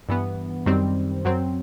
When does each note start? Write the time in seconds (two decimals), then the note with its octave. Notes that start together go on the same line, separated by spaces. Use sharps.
0.09 G2 E3 B3
0.66 F#2 D#3 G3 C4
1.25 F#2 F#3 C4